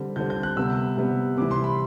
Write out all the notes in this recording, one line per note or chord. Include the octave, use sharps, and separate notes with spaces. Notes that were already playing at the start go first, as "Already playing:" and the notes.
Already playing: D3 G3 C4
D3 G3 C4 G6
G6
F#6
C3 G3 B3 E6
C3 G3 B3
C3 E3 G3 D6
C6
B5